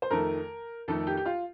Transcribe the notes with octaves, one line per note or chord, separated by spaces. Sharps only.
C5
F2 D#3 A3 A#4
F2 D#3 A3 A4
G4
G4
F4